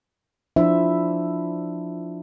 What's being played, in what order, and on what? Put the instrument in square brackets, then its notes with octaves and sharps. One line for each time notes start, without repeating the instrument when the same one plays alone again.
[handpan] F3 D4 E4 C5 E5